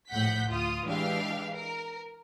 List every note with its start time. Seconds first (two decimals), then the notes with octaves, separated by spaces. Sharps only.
0.10 A#1 A2 F#5 G6 B6
0.49 D2 F4 D#6
0.85 E3 G#3 D4 G4 F5
1.53 A#4